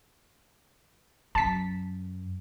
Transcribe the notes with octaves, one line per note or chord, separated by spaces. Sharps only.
F#2 A5 B6